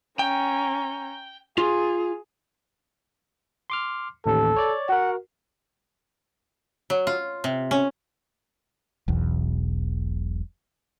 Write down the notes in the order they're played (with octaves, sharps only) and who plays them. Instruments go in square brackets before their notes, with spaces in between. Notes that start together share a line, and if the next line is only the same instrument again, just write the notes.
[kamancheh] C#4 A#5 [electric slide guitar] G5
[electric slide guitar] F4 [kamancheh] G#4
[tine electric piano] C6 D6 F6
[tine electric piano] A1 D#2 [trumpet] A4
[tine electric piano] C#5 D5
[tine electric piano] F#4 A#4 [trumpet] F#5
[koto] F#3
F4
C3
C#4
[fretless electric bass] E1 B1 E2